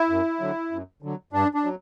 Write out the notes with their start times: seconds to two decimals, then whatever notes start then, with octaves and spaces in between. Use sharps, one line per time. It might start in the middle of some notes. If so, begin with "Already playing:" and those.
Already playing: E4
0.10 F#2
0.40 D3 F#3
0.71 F#2
1.03 D3 F#3
1.33 G2 D4
1.54 D4
1.64 F#3